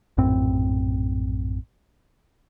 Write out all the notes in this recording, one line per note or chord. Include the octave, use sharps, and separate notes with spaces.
A#1 F#2 A2 C4